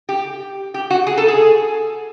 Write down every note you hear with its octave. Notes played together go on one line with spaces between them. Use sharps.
G4
G4
F#4
G#4
A4
G#4